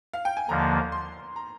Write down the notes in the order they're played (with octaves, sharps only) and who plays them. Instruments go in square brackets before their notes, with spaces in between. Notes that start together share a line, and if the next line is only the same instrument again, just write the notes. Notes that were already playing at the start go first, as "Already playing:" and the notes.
[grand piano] F5
G5
G#5
[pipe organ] D#2 D3 F3 A#3 [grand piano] A#5
[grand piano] C6
A#5